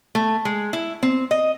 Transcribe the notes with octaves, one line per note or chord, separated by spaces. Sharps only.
A3
G#3
E4
C4
D#5